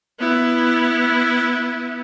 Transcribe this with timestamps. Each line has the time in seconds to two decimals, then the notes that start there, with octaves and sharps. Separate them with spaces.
0.19 B3 E4